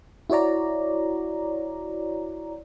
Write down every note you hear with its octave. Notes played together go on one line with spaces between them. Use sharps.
E4 F#4 C#5 D5 A#5